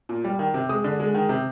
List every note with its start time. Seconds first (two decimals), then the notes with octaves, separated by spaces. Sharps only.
0.09 A#2
0.24 G3
0.39 D#3
0.54 C3
0.69 G#3 D#6
0.84 D3
1.00 G#3
1.14 D#3
1.29 C3